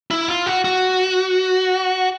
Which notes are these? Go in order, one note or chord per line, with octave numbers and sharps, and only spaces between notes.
E4
F4
F#4
F#4